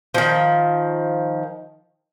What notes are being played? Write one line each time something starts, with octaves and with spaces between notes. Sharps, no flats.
D#3 F3